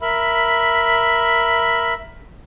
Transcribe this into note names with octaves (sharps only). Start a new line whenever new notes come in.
A#4 E5 B5